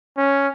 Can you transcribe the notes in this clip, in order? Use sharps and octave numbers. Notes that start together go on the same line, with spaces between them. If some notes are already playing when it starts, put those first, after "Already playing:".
C#4